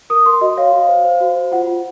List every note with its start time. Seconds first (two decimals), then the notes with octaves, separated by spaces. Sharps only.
0.10 A#4 D#6
0.26 A#4 C6
0.41 F#4 D#5
0.57 C#5 F5
0.72 F#4
0.88 C5
1.04 C5
1.20 F#4
1.36 C5
1.52 F4 F#5
1.67 F4